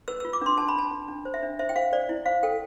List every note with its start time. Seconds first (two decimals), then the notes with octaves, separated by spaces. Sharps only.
0.08 B4 E6
0.20 F4 E6
0.33 D6
0.41 D4 C6
0.58 D4 A5
0.68 B5
0.75 D4 A5
0.91 D4
1.08 D4
1.25 C5
1.34 E5
1.42 D4
1.59 C5 E5
1.69 G5
1.76 C5 F5
1.93 C5 D5
2.09 E4
2.26 C5 F5
2.43 A4 G5